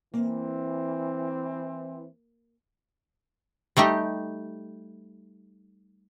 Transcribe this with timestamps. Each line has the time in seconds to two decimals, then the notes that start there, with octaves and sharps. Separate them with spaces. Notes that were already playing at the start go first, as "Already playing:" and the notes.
0.14 E3 A#3 C4
3.77 G3 A3 D#4 G4